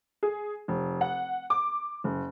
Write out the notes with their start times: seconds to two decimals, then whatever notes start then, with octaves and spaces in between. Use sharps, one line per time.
0.23 G#4
0.68 F1
1.01 F#5
1.50 D6
2.04 F#1